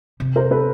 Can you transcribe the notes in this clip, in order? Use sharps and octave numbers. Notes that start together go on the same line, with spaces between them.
C3
A#4 C5
A4 B4